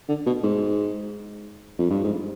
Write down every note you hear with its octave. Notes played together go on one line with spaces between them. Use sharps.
D3
B2
G#2
F2
G2
G#2